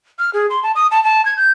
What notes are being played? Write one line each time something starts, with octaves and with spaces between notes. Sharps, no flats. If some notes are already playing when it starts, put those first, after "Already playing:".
F6
G#4
C6
A5
D#6
A5
A5
G#6
G6